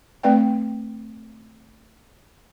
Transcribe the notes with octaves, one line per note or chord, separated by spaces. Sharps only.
A3 C4 B4 D5 F5 G5